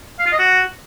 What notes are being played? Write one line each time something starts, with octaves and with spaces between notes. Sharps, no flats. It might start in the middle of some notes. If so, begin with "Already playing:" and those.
F5
F4
D#5
F#4